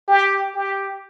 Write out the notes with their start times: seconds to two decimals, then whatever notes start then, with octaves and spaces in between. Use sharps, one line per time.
0.08 G4
0.54 G4